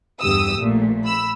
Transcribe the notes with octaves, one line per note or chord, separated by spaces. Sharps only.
E2 G2 D3 G4 D#6 E6
A#1 A#2 A3
B5 E6